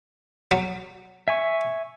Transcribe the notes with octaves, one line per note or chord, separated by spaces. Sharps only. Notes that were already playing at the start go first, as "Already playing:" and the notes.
F#3
E5 G#5 C#6